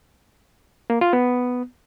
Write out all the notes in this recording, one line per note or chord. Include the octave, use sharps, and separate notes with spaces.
A#3
F4
B3